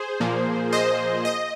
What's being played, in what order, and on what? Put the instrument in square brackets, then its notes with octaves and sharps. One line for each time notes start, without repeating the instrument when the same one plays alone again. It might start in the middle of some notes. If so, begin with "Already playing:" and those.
Already playing: [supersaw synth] G#4 C5
A#2 F3 A#3
C5 D#5
D#5